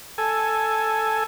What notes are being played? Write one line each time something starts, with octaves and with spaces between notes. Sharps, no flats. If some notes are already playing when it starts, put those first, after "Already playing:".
A4 G#5